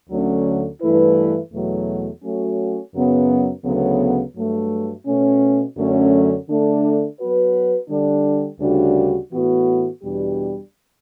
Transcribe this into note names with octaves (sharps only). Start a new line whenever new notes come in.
D2 D3 F#3 A3 C#4
G2 E3 A3 E4 B4
E2 B2 F#3 A3
F#3 A3 C#4 F#4
F#2 C#3 F#3 B3
D2 C#3 F#3 B3
G2 F#3 A3
B2 A3 C#4
F#2 D3 F#3 A3 C#4
D3 A3 D4
F#3 B3 F#4 B4
D3 G3 D4
D2 C#3 G3 D4 F#4
A2 E3 B3 F#4
E2 B2 G3 D4 G4